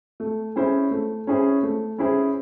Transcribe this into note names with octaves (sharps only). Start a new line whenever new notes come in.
A3
C#4 E4 G#4 C5
A3
C#4 E4 G#4 C5
A3
C#4 E4 G#4 C5